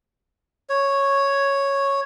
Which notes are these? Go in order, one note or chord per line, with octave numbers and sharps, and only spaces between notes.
C#5